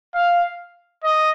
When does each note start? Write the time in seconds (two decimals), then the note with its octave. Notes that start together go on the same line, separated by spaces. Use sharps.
0.14 F5
1.04 D#5